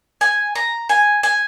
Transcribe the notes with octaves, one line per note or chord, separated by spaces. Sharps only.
G#5
A#5
G#5
G#5